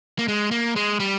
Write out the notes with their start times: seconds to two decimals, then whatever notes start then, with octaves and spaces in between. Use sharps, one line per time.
0.19 A#3
0.28 G#3
0.51 A#3
0.76 G#3
1.00 G3